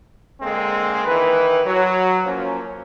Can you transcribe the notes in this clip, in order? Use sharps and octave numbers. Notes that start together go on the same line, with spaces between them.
D3 G#3 A#3 C4
D#3 E3 B4
F#3
F3 A#3 C#4